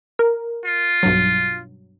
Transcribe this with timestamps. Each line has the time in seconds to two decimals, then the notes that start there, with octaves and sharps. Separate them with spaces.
0.19 A#4
0.65 F4
1.03 B1 G2 F#3